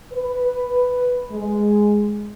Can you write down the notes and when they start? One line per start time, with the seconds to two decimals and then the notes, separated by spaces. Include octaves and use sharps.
0.13 B4
1.32 G#3